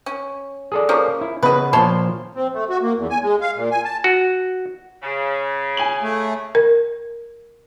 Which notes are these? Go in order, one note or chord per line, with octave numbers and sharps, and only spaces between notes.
C#4
G#4 A4 D5
F3 A#3 C#4
E4
C#3 B3 B4 D#5
A#2 F3 C#5 A5 C6
C4
A3
F#4
A#3
E2
G#5
G#3
F5
A#2
G#5
A5
F#4
C#3
G#5 F#7
A3
A#4